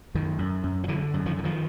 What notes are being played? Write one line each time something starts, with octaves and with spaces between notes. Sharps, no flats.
F#2 D#3
F#2
F#2
F3
D3 E3 F#3
F#2
D#3 F3
D3
D#3 F3